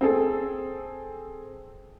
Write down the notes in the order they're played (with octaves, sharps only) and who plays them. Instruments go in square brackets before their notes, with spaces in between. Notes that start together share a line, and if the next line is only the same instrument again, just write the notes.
[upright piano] C4 G#4 A4